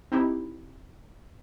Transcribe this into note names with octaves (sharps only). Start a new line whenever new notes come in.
C4 D#4 E4 G4